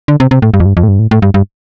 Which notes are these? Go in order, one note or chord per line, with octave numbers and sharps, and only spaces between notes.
D3
C3
C3
A2
G2
F2
G2
F2
A2
G2
A2
A2
G2
G2